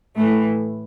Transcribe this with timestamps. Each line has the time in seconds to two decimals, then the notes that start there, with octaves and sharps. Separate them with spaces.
0.16 A2 E3 A3